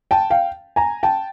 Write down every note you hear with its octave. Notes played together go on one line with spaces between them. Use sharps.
G5 A5
F5 G5
G#5 A#5
G5 A5